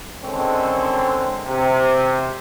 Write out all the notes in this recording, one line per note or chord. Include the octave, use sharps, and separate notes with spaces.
D3 D#3 G#3 C4 C#4 A4
C3